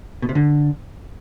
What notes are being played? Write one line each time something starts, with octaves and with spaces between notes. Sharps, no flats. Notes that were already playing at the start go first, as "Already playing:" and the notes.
B2
C3
D3